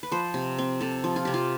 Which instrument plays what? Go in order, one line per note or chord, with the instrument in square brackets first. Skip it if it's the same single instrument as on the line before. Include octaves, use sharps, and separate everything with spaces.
[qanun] B4
F3 C5
C3
C4
C3 A4
F3
F4
C3 G4
F4